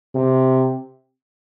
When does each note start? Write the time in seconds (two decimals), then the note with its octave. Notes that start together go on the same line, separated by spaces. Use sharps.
0.15 C3